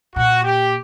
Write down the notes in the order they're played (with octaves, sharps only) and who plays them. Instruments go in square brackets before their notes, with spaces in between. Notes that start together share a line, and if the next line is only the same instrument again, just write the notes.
[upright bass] A#2 [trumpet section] F#4
[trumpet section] G4